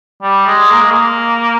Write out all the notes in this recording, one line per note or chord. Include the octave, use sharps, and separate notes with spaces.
G3
G#3
A#3
G#3
A#3